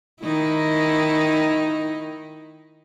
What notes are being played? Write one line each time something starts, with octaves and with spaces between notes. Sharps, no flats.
D#3 D#4 E4